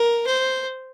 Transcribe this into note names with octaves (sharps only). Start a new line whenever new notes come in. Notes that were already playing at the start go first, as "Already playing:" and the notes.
Already playing: A#4
C5